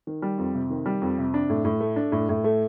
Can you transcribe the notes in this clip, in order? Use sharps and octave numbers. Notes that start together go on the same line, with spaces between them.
D#3
G3
F2
C3
D#3
G3
F2
C3
D4
A2
A2
A3
D4
A2
A2
A3